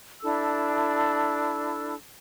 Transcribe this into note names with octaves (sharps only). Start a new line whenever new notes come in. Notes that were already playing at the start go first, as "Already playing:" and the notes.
D4 E4 A4 E6